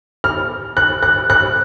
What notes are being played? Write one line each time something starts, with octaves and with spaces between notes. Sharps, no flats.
F6
F#6
F#6
F#6